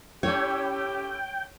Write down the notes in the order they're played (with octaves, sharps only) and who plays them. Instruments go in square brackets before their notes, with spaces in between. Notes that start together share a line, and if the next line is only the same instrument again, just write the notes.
[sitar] A2 C#4 E4 [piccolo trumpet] G4 [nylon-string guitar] C#5 [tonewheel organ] G5